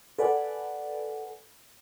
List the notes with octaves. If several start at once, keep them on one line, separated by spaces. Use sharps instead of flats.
A4 B4 D5 F#5 G#5